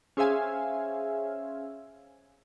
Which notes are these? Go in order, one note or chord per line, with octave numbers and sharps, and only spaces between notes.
C#4 G#4 C5 E5 F5 G#5